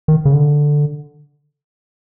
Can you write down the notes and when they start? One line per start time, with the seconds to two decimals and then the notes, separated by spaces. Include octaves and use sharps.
0.08 D#3
0.25 C#3
0.33 D3